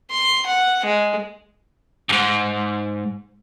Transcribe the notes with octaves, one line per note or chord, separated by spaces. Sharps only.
C6
F#5
G#3
F2 G#2